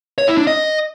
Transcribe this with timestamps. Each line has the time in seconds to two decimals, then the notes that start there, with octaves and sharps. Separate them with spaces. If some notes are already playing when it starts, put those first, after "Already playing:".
0.18 C#5
0.28 E4
0.37 D4
0.47 D#5